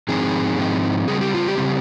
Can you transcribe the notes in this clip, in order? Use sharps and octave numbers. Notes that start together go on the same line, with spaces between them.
G#2 F3 C4 D#4 G#4
G#2 F3 C4 D#4
C#3 G3 C4 G#4
G4
F4
G4
C#3 G3 C4